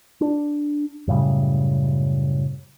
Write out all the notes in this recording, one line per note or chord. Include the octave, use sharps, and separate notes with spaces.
D4
F#2 A2 C#3 G3